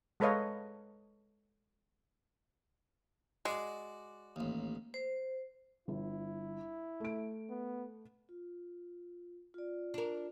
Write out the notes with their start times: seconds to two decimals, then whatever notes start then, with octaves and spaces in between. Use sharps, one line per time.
0.20 G#3 A4 B4 C#5 D#5 F5
3.45 G#3 F#4 D5
4.36 A1 D#2
4.94 C5
5.88 G1 E4
7.00 A3 D7
7.50 B3
8.29 F4
9.54 F4 D5
9.94 D4 A#4